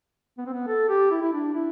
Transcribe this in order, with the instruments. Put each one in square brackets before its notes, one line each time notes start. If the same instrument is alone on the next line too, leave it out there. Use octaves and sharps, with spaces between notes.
[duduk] B3
C4
B3
A4
G4
E4
E4
D4
E4